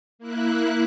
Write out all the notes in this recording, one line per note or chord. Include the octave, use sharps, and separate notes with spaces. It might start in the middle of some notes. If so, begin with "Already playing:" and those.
A#3 E4 F#6